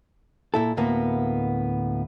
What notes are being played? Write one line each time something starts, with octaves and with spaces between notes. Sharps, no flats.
A#2 E4 A4
D2 A2 A#3 B3